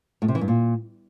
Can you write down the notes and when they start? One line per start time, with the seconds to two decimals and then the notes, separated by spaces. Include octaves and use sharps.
0.22 A2
0.28 C3
0.35 E3
0.41 G2
0.48 A#2